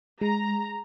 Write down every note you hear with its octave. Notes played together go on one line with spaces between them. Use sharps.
G#3 A#5